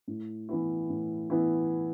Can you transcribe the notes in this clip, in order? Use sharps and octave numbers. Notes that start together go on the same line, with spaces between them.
A2
E3 B3 E4
A2
E3 B3 E4